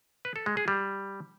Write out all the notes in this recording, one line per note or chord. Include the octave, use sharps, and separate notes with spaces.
B4
A4
G#3
G#4
G3